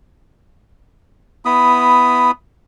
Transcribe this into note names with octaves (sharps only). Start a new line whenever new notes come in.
B3 E4 B5 D#6